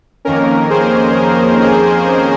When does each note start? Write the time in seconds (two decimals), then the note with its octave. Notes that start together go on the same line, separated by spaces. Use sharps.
0.25 F2 D#3 A#3 C#4 A#4
0.70 G#4 C5
1.16 A#4
1.61 G#4